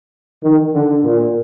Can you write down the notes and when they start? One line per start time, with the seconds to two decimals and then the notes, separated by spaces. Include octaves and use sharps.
0.44 D#3
0.74 D3
1.04 A#2